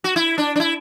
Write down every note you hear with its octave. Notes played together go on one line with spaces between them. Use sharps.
F#4
E4
D4
D4
E4